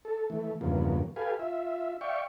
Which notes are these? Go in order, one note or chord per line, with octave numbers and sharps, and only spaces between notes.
A4
E3 A3
E2 G2 C#3 F3 A#3 B3
G4 A4 B4 F5 G#5
F4 E5
D5 E5 F5 G5 C#6